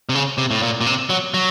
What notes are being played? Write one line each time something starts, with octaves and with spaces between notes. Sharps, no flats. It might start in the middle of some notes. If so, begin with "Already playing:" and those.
C3
C#3
C3
A2
A#2
A#2
C3
F#3
F#3